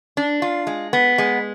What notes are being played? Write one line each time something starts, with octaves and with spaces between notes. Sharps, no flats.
D4
F4
G#3
B3
G#3